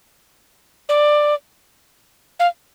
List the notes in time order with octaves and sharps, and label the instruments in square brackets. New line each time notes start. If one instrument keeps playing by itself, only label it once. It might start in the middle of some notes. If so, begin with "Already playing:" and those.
[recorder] D5
F5